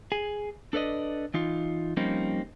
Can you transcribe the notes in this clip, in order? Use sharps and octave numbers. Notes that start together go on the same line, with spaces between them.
G#4 G#5
D4 A4 B4 D5 D#5
E3 D#4 F4
F3 G3 A#3 C4 C#4 D#4